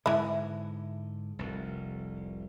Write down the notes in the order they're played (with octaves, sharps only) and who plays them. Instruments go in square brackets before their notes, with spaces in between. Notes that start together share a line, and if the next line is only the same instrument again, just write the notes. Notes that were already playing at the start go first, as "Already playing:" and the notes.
[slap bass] G#2 D3 G#3 [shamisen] E3 E4
[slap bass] F1 C2